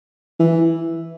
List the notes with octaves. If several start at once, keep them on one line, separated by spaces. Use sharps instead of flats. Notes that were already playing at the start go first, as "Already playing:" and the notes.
E3